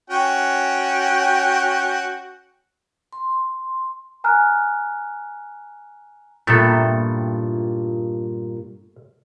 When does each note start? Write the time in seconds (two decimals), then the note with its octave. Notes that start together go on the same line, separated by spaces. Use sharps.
0.10 C#4 F#4 G5
3.13 C6
4.24 G#5 A#5 F6 F#6
6.47 G2 A#2 A3 B3 E4 A4